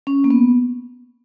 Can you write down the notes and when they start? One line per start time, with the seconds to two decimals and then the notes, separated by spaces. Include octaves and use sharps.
0.07 C#4
0.24 A#3
0.31 B3